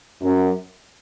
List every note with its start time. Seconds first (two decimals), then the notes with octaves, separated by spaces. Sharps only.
0.22 F#2